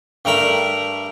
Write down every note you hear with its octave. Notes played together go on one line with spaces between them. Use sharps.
G2 G3 A3 A#4 A#5 B5